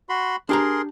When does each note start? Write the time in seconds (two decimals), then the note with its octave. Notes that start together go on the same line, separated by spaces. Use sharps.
0.09 F#4 B5 C6
0.49 D4 G4 G#4 A#4 A#5 C6